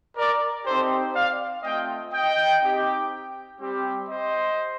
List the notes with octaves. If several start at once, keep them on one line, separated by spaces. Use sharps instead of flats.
A#4 D5
C4 D#4 G4 A4 C5
D5 F5
A3 C4 F4 D#5 G5
D#5 G5
C4 D#4 G4
G3 C4 G4
C5 D#5